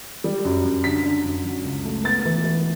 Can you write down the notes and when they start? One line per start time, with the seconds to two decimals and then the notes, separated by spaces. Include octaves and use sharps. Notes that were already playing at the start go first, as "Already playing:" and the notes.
0.24 G3
0.45 F#2
0.65 F#2
0.84 D3 B6
1.04 D3
1.25 F#2
1.44 F#3
1.64 C#2
1.85 A3
2.04 B3 A6
2.25 E3
2.44 E3